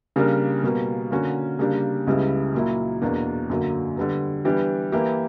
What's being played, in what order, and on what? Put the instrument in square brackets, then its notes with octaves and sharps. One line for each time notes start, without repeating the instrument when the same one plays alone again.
[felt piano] C#3 G3 A#3 D4 A#4
B2 G3 A#3
D3 A#3 C#4 F#4
C#3 G3 A#3 D4 G4
C#2 C#3 G3 B3 E4
A#2 F#3 A#3 E4
E2 B2 A#3 D4
F#2 D3 F#3 A#3
D3 G3 B3
E3 G3 B3 D4 G4
E3 A#3 E4 G4